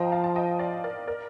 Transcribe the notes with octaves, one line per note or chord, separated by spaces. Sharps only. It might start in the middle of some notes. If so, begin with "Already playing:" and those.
Already playing: F3 C5 D#5 G5 A#5
F5 A5
A5
D#5 G5
D5 F5
A#4 D5
A#4 D5